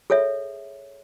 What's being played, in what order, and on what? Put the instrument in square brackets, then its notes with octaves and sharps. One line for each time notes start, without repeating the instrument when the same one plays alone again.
[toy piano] G#4 A4 C#5 E5